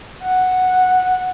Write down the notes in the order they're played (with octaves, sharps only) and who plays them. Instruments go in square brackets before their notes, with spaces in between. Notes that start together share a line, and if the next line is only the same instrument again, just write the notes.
[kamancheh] F#5